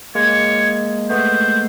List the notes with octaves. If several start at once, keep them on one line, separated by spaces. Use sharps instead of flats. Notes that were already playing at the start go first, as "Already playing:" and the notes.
G#3 A#3 C#5
A3 B3 C5